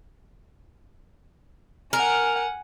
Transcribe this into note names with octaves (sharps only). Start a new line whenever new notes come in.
A#4 F#5 G#5